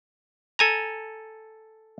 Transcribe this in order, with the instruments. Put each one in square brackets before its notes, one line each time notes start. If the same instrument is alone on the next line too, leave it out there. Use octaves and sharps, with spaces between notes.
[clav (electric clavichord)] A4 G#5 A#5